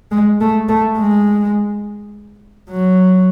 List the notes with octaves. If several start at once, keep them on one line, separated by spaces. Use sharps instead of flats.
G#3
A3
A3
G#3
F#3